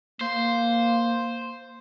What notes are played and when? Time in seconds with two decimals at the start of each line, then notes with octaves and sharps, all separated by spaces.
0.21 A#3 C5